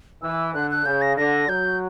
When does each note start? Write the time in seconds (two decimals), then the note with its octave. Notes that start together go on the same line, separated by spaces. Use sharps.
0.22 E3 E6
0.54 D3 F#6
0.71 F#6
0.86 C#3 G6
1.01 A#6
1.17 D3 A#6
1.49 F#3 G6